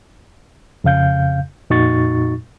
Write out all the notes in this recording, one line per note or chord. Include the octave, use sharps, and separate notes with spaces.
F2 C#3 F5 G6
F2 A#2 D#4 F#4 C#6 A6